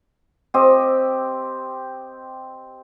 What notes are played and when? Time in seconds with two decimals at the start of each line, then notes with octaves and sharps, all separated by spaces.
0.54 C4 G4 D#5